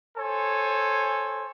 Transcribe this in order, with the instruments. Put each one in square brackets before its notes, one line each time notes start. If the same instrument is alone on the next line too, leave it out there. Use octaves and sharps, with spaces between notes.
[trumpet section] A4 C5 C#5 G#5